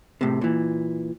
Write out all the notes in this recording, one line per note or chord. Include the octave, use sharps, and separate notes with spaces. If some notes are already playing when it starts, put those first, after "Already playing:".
A2 C3
A#2 E3